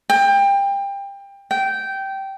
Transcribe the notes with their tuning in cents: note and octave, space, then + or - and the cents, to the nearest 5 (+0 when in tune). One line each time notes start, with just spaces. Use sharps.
G5 +25
G5 -15